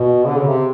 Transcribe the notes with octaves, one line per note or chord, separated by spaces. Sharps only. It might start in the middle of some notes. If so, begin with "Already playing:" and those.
Already playing: B2
D3
C#3
C3